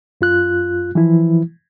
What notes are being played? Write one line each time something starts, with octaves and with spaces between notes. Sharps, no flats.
F#2 F4 F#6
E3 F3 E4